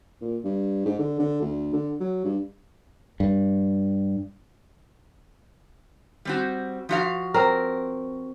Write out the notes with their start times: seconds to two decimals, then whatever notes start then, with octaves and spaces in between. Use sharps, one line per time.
0.21 A#2
0.44 G2
0.86 G#2
0.99 D3
1.19 D3
1.41 D2
1.73 D3
2.00 F#3
2.25 G2
3.20 G2
6.25 G3 C4 F#4
6.89 F3 F#4 F5
7.34 C4 A#4